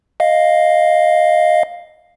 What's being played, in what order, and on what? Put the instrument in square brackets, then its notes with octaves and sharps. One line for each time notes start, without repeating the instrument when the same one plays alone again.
[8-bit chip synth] D#5 F5